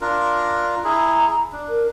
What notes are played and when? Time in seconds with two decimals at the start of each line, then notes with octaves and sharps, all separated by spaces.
0.01 D4 F4 A#4
0.84 E4 G#4 A#5
1.53 D4
1.69 A#4